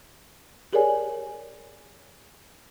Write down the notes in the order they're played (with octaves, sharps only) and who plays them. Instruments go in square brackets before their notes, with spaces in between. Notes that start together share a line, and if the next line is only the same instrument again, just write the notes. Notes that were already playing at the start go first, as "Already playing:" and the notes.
[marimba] G4 G#4 A#4 C#5 D5 G#5